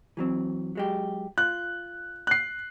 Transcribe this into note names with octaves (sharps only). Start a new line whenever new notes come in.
E3 F#3 C4
F#3 G#3 G4
F4 F#6
F#6 C7